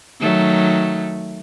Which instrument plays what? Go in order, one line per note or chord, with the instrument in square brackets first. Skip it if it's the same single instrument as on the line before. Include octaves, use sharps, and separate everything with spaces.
[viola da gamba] D#3 F#3 A3